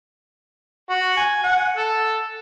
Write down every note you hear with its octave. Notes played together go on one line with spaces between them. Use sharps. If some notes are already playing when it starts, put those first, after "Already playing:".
F#4
G#5
F#5
A4